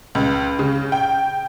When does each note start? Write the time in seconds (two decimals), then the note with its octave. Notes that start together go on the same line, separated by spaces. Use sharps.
0.15 C#2
0.59 C#3
0.92 G5